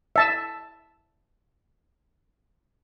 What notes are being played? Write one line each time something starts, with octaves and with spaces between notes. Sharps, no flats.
E5 A5 E6